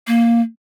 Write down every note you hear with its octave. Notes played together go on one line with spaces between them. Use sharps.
A#3